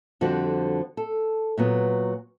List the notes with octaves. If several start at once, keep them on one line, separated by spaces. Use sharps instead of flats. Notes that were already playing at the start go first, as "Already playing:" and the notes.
F2 D3 F3 G3 F#4 C5
A4
A#2 F#3 B3